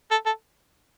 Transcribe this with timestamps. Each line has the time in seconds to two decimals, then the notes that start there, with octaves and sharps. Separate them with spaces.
0.11 A4
0.26 A4